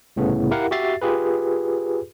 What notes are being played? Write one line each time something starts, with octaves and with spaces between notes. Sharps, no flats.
C2 A2 C#3 B3
E4 G4 A#4 F5 F#5
F#4 G4 E5 A6 C7
F4 G4 G#4 B4